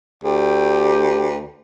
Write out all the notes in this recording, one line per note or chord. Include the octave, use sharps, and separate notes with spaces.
D2 G4